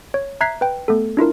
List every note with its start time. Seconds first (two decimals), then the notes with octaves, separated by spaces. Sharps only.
0.14 C#5
0.41 E5 A#5 F#6 G#6 B6 C7
0.61 B4 G5
0.88 A3 B3 A4
1.17 D4 E4 F4 A#4